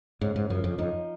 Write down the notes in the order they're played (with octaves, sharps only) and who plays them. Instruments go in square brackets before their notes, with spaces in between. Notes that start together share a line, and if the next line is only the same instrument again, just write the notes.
[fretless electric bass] G#2 [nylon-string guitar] C#3
[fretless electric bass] G#2
[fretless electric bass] F#2 [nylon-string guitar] F3
[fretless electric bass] F2
[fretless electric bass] F2 [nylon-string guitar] D#4